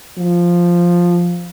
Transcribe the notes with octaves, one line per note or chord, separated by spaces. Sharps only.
F3